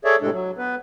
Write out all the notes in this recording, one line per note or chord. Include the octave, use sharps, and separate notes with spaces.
G#4 A4 C#5 D5 E5
A2 C3 G#3 D4 A4
F#3
B3 B4